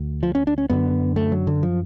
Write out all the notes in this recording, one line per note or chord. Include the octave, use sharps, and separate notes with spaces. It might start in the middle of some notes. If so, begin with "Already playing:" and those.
Already playing: D2
F3
C#4
D4
C#4
F#2 D3 B3
A3
F#3
D3
F3